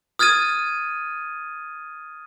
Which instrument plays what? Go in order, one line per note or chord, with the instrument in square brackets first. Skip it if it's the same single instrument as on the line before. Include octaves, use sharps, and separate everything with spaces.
[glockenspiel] D#6 F6 G#6 A6 D#7